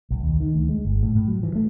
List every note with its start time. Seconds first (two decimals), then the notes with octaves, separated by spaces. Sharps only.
0.11 B1
0.23 D#2
0.40 D#3
0.55 D2
0.69 G#3
0.85 G1
1.03 A2
1.15 A2
1.28 F#3
1.43 E3
1.55 A3